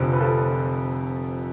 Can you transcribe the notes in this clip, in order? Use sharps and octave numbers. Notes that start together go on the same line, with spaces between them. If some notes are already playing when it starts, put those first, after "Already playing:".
Already playing: F1 F2 D3
B4
F4 A4